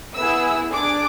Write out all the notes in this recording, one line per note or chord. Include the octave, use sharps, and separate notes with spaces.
B3 E4 G#4 E6
D4 G#4 D6